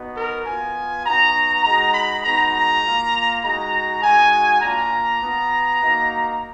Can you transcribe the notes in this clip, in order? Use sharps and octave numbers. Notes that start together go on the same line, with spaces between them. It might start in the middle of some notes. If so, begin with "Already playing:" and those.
Already playing: B3 D#4 F#4
A#4
B3 F4 G#5
B3 D#4 F#4 A#5
G#3 D#4 F#4 A#5
B5
G#3 B3 D#4 F#4 A#5
A#5
A#3 F4
G#3 D#4 F#4 A#5
G#3 D#4 F#4 G#5
A#3 D4 F4 A#5
B3 F4
A#3 D#4 F#4